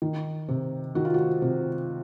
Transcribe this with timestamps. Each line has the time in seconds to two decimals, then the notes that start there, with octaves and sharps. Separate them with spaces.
0.02 D#3
0.48 C3
0.95 D#3 F#4
1.05 F4
1.14 F#4
1.42 C3